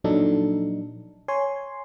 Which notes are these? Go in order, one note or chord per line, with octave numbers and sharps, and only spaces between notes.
A#2 F3 F#3 D4 D#4 A4
C#5 G#5 C6